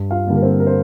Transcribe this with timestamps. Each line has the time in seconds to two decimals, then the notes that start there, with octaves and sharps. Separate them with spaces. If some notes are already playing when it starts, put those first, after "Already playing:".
Already playing: G2
0.11 F4 F5
0.27 D3 G3 A#3
0.36 A#4
0.42 C4 C5
0.60 A#4
0.67 C5